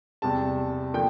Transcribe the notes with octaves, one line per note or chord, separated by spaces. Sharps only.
E2 C3 G3 A5
D3 F3 A#3 G5